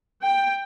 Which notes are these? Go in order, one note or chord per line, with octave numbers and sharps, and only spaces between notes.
G5